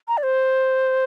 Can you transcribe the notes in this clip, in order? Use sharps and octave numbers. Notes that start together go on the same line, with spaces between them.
A#5
D5
C5